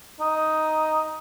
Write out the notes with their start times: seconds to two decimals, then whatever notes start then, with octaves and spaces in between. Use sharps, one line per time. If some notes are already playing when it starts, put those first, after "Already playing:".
0.21 D#4